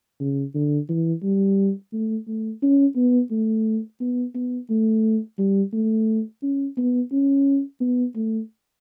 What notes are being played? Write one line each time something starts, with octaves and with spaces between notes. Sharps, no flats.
C#3
D3
E3
G3
A3
A3
C#4
B3
A3
B3
B3
A3
G3
A3
C#4
B3
C#4
B3
A3